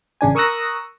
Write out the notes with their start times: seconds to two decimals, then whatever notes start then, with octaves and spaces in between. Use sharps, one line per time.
0.21 A1 C#3 D4 G#5
0.35 A#4 C#6 D#6 E6 F#6 A#6